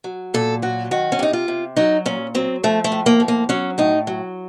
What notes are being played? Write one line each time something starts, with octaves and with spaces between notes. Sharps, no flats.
F#3
A#2 A4
F#3 F#4
D#3 F#4
C#4
C3 D#4
F4
C3
F#3 D#4
A#2 C#4
F#3 C4
F3 A3
A3
A2
A#3
F3
A#3
F#3 C#4
A2 D#4
F#3